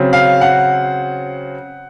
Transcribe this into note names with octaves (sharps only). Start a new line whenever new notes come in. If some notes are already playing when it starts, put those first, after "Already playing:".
Already playing: C#3 F#3 C4
F5
F#5